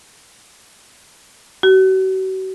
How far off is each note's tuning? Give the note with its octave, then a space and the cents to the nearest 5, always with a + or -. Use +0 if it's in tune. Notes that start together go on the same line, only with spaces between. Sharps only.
F#4 +40